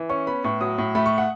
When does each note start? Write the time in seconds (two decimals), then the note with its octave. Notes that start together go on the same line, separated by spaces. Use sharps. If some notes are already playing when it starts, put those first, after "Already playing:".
Already playing: E3
0.09 C#4 C#6
0.27 B3 B5
0.44 A2 C#6
0.61 F#3 D#6
0.78 A2
0.95 A3 B5
1.06 C#6
1.18 F#5